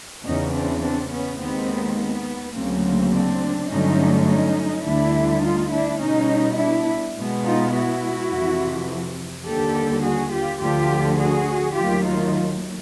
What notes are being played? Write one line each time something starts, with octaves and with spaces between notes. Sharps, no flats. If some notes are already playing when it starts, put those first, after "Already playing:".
E2 C#3 E3 C#4 D#4
C4 D4
C4 D4
B3 C#4
D#2 D#3 G#3 B3 C4
B3
D2 C#3 F#3 A#3 C4
C4
C4 D4
G2 D3 F#3 A3 C#4 D#4
C#4 D#4
D2 D3 G3 D4 E4
D#4 F4
D4 E4
B2 G3 B3 C#4 D#4
D4 E4
B2 G#3 B3
D#4 F4
E4 F#4
F2 C3 E3
D#2 D3 G3 G4 A4
F#4 G#4
F4 G4
D2 D3 F3 F4 G4
F#4 G#4
D#2 D#3 F#3 A3 F4 G4
D#4 F4